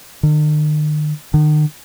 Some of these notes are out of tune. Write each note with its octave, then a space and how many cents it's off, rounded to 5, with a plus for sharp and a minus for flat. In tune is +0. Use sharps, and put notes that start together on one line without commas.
D#3 -45
D#3 -45